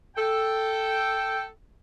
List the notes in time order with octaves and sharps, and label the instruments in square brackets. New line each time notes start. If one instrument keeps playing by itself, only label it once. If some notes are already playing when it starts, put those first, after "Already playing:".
[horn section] A4 G5